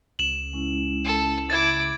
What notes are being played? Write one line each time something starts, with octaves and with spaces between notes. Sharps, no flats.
C#2 E7 F#7
G#3 C#4 E4
A4
E4 D6 G#6 A6